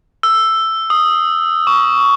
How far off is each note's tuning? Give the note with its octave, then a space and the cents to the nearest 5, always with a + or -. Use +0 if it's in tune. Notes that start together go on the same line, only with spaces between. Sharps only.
E6 +5
D#6 -5
C#6 +15